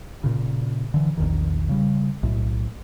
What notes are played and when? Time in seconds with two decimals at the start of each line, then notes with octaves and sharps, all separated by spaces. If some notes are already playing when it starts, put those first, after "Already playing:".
0.24 A#2 C#3
0.94 D3 E3
1.17 A#1 E2 D#3
1.69 C#3 G3
2.23 B1 A2